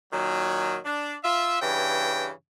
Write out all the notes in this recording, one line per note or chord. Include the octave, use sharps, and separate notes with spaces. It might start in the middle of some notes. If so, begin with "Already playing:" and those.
A#2 D#3 F#3
D4
F4 E5
G2 C#3 E3 G5